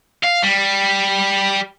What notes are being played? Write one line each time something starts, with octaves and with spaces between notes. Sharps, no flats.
F5
G3